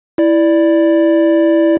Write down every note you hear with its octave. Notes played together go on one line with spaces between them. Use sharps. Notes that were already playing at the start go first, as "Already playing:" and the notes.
E4 D5